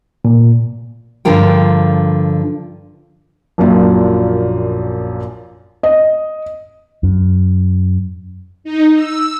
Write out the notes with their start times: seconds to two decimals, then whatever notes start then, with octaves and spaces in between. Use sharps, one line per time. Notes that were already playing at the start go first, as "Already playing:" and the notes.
0.25 A#2
1.25 G2 D3 F3 F4 A#4 G5
3.58 A#1 F#2 A#2 F3
5.83 D#5
7.03 F#2
8.64 D#4
8.95 E6